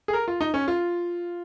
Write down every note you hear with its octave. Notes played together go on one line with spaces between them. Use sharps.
G#4
A#4
F4
D#4
C#4
F4